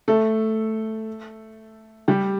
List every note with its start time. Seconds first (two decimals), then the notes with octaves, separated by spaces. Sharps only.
0.08 A3 A4
2.08 G3 G4